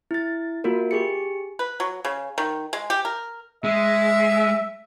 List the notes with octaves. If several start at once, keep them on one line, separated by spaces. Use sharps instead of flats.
E4 A6
A#3 F4 F#4 A#4
G4 G#4 C#7
B4
F#3
C#3
D#3
G#3
G4
A#4
G#3 E5